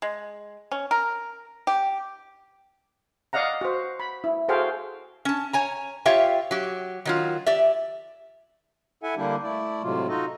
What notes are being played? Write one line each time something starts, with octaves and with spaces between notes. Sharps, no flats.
G#3
C#4
A#4
G4
D5 D#5 F5 F#5 A#5
F#4 C5
B5
E4
F#4 G#4 A4 C5 F5 G5
C#4 A5
C#5 G#5 A#5
F4 G4 C#5 E5 F5 G5
F#3 G4
D#3 F#3 F4
G4 D5 E5
E4 A4 E5 F#5 G#5
D3 G3 A#3 D4 E4 G4
A3 E4 D5
A2 C3 F#3 G#3 F4
D#4 F4 F#4 A4 D#5